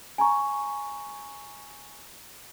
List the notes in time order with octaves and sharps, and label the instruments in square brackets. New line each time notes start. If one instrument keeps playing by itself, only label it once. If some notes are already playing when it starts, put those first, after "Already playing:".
[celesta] G#5 A#5 C#6